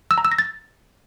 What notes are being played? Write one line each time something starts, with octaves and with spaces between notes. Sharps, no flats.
E6
A#5
E6
A#6
A6